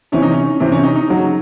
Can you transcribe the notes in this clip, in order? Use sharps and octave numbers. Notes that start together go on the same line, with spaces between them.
C3 E3 C#4
D#4
C#4
C3 E3 C4
C#4
D#4
D#4
C#3 F#3